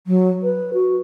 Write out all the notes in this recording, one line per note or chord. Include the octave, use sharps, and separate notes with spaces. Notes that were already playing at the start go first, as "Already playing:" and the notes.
F#3
B4
F#4